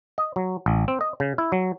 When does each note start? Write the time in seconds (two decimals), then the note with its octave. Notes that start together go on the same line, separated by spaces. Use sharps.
0.18 D#5
0.36 F#3
0.66 A1
0.88 C4
1.01 D#5
1.20 C#3
1.38 E4
1.52 F#3